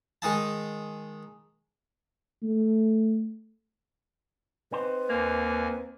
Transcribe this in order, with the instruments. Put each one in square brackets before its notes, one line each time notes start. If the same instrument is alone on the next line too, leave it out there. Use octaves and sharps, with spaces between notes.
[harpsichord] D#3 G#3 D#4 A5
[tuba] A3
[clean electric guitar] C4 D#4 C5 [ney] B4
[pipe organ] D#2 G#5 [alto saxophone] A#3